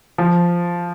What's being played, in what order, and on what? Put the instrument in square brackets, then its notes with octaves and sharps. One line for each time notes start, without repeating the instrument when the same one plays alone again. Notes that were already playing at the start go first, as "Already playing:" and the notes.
[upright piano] F3